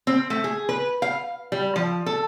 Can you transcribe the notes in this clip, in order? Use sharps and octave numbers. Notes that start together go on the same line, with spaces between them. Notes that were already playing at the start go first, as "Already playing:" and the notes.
C4
A3
G#4
B4
F5
G3
F3
A4